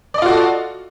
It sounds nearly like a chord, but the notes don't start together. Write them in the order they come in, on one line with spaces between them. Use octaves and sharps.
D5 D#5 F4 F#4 A4